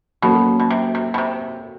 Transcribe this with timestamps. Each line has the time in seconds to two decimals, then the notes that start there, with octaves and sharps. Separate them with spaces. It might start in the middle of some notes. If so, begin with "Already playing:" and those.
0.22 B2 F#3 A#3 C#4 F#4 A4
0.59 B2
0.70 C3
0.95 C3
1.14 B2
1.18 C3